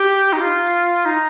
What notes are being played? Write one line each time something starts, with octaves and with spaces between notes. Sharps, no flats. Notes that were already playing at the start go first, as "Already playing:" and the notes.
Already playing: G4
D#4
F4
D#4